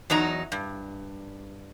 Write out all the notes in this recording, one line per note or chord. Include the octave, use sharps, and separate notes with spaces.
E2 F#3 D#4 A#5
G2